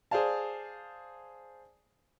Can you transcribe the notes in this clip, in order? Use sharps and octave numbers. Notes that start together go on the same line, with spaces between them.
G#4 C5 D5 F5 A5